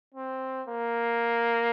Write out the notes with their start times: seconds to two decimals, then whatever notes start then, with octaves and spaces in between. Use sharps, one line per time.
0.14 C4
0.68 A#3